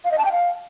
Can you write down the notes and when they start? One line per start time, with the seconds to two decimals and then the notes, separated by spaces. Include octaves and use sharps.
0.04 F5
0.11 D#5
0.18 A5
0.25 G5
0.32 F5